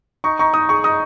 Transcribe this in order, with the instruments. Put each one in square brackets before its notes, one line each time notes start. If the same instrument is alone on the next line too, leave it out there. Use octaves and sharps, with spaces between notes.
[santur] D#4 [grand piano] C#6
[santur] D#4 [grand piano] C#6
[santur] D#4 [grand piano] D#6
[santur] G#4 [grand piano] C#6
[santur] D#4 [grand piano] D#6